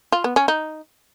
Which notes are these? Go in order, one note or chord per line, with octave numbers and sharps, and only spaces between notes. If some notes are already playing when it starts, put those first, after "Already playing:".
F4
B3
C#4
D#4